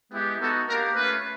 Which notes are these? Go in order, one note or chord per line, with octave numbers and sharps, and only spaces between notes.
G#3 B3 E4 G4
B3 D#4 F#4 A4
A#3 D4 G4 A#4
A3 C#4 F4 B4